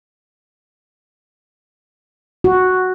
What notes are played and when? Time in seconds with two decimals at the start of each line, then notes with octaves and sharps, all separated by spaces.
2.44 F#4